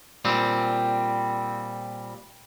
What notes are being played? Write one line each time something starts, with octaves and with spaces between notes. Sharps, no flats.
A#2 G3 C4